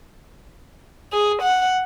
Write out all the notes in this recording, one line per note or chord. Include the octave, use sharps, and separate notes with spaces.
G#4
F#5